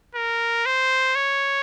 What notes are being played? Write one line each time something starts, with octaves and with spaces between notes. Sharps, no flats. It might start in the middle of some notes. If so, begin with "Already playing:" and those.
A#4
C5
C#5